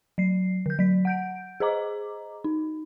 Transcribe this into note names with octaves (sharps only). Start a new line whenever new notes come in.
F#3 C7
D3 G6
F#3 B6
F#5 G6 D7
G#4 C5 D#5 A#5 D6
D#4